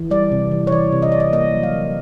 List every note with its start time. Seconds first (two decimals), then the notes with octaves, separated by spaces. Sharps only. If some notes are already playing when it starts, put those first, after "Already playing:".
Already playing: E3
0.11 G3 D5
0.32 C3
0.51 E3
0.67 C#5
0.71 E3 D5
0.92 C3
1.02 D#5
1.12 C3 D5
1.20 D#5
1.32 A#3 D#5
1.54 F#3
1.63 F5
1.73 D3